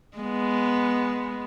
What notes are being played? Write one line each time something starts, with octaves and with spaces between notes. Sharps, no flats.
G#3 B3